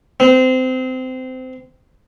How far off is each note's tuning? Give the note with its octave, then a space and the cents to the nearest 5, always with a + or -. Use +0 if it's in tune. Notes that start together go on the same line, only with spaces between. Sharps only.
C4 -25